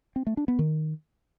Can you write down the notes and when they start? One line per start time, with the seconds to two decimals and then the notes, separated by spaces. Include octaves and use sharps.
0.16 C4
0.27 A3
0.37 D4
0.48 B3
0.59 D#3